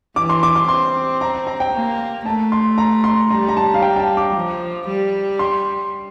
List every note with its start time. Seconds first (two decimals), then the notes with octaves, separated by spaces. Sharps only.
0.16 E3 D6
0.30 C6
0.43 D6
0.56 C6
0.69 C4 C6
1.21 A#5
1.47 A#5
1.60 G5
1.73 A#3
2.25 A3 A5
2.52 C6
2.78 A#5
3.04 C6
3.30 G3 A#5
3.48 A#5
3.57 A5
3.74 F5
3.82 G5
3.96 G5
3.99 A5
4.17 D6
4.35 F3
4.87 G3
5.39 C6